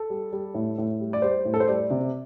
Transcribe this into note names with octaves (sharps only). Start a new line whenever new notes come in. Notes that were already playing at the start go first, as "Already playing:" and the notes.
Already playing: A4
G3
G3
A2
A2
G3
D5
G3 C5
A2
A4
C5
G3 D5
C3